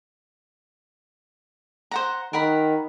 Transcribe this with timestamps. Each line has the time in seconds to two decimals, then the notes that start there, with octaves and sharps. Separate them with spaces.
1.91 C5 F#5 A#5
2.33 D#3 A#4 F#5 B5